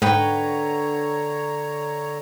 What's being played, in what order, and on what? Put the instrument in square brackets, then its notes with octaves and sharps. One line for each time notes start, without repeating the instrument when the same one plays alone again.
[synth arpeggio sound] G#2 [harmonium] D3 C#5 A#5 [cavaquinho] B4 F#5 G5